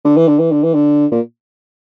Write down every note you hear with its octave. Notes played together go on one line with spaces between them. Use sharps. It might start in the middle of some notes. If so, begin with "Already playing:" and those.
D3
E3
D3
E3
D3
E3
D3
A#2